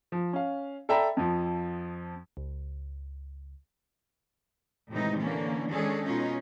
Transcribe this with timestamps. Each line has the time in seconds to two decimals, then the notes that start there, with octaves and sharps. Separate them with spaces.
0.12 F3
0.33 C#4 F5
0.89 A4 D5 E5 G5 A#5 B5
1.17 F2 F3
2.37 C#2
4.90 A2 C3 D#3 E3 G#3 D#4
5.19 D3 E3 A#3 C#4
5.70 D#3 G#3 C#4 D4 G#4 A4
6.05 B2 C#4 D#4 F4